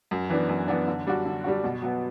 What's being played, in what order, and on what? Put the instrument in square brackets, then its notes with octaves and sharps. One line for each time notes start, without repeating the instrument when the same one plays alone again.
[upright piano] F#2
E3 B3 D4
F#2
E3 B3 D4
D3
G3 D4 F#4
D3
G3 D4 F#4
B2
F#3 B3